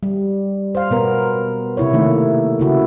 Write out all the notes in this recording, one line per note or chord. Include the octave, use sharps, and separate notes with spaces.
G3
C5 F5
B2 B3 A#4
C3 E4 C#5
D#3 A3 A#3
C#3 E4 F#4